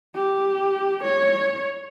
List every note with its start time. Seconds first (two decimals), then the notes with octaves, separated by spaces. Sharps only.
0.15 G4
1.04 C#5